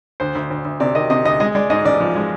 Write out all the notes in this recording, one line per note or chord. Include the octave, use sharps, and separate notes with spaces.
D2 C5
D2
D2
D2
C3 D5
D#3 D#5
C3 D#5
D2 D#5
G#3 D#5
G#3 D5
G#2 D#5
A1 D5
F3
G#3